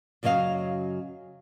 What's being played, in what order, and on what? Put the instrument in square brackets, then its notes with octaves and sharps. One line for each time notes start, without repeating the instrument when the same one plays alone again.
[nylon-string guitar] F#2 C#3 F#3 D#5 F5